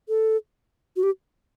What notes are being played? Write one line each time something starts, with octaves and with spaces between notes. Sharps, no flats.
A4
F#4
G4